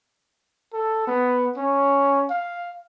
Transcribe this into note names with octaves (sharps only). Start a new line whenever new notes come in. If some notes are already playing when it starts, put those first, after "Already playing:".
A4
B3
C#4
F5